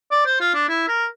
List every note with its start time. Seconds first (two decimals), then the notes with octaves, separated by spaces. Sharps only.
0.11 D5
0.26 C5
0.41 F4
0.54 D4
0.69 E4
0.88 A#4